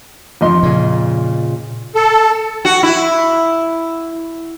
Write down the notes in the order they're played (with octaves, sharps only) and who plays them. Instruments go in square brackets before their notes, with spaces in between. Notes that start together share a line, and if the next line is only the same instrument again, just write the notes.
[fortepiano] F2 D#5 C6
[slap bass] A#2 C#3
[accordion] A4
[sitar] F#4
E4